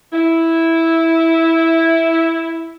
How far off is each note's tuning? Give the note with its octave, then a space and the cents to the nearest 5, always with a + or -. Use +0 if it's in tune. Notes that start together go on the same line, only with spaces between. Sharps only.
E4 -5